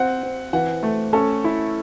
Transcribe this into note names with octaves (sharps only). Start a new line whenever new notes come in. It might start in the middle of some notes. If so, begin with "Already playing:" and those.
Already playing: C4 F#5
C4
E3 F#5
A3
C#4 A4
E4